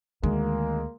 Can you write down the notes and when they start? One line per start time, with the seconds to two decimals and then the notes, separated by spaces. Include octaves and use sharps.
0.23 D2 D#3 G#3 A#3